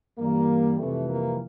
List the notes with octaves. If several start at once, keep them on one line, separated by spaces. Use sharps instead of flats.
G2 E3 G3 A#3
F2 C3 E3 G3 A3
A#3